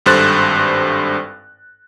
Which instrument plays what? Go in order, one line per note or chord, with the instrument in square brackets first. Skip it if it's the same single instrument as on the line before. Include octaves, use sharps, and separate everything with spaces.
[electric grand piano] G#1 G2 A4 C5 F#6 A6